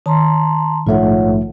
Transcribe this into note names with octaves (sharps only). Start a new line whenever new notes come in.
D#3 A5 A#5 C6
A#1 G#2 A3 F4 C#5 F#5